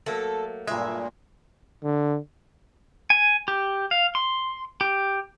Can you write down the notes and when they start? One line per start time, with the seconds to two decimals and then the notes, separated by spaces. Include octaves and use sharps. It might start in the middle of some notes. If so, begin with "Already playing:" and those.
0.06 F#3 A3 A#3 A4
0.67 G2 A#2 G#3 E5 G#5
1.83 D3
3.10 G#5
3.48 G4
3.91 F5
4.15 C6
4.81 G4